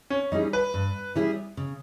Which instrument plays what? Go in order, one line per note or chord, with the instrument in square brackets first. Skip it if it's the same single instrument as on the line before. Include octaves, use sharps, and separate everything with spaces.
[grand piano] C#4
[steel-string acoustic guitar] G3 C#4 E4 G#4 [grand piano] D#4
[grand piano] B4
[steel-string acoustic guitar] G2
G3 C#4 E4 G#4
C#3